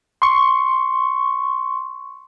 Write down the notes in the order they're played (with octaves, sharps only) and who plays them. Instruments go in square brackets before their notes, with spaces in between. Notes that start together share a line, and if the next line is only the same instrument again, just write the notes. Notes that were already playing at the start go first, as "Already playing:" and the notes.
[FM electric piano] C6 C#6